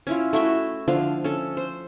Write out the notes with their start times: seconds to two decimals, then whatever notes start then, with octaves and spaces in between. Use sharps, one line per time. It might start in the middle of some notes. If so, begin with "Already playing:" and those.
0.07 C#4 E4 F4
0.33 A3 E4 F#4 E5
0.88 D3 F3 F4 F5
1.24 C#4 A4
1.57 C5